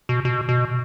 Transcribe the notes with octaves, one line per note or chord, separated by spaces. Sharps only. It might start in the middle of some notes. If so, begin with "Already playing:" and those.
B2
B2
B2